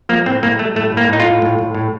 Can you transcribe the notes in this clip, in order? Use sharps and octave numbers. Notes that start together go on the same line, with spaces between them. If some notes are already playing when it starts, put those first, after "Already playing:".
F3 A#3
A2 C4
A2 A#3
A3
A2 A3
A2 A#3
A2 D#4
F4
A2
A2
A2
A2